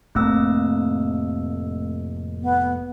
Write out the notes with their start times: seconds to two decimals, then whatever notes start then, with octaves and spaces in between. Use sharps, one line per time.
0.15 F1 A2 A3 A#3 C4 E6
2.42 B3